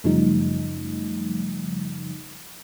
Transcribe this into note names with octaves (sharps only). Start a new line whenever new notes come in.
F#2 C#3 F3 G3 A3 D#4